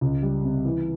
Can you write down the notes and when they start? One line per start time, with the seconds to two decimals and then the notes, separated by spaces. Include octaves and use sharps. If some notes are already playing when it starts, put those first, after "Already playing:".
0.01 C#2
0.23 G3
0.44 C3
0.65 E3